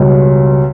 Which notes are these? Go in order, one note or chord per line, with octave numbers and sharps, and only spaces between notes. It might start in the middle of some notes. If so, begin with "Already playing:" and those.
Already playing: C#2 B2 G3 C#4